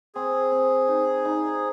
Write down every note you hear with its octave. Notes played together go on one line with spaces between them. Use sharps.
C4 G#4
C4
D#4
D#4